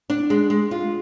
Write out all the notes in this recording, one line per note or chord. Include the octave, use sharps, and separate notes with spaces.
D4
G#3
G#3
F4